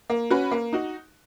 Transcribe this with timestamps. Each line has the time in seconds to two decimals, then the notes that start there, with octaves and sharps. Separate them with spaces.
0.10 A#3
0.31 C#4 F#4 B4
0.51 A#3
0.73 D#4 F#4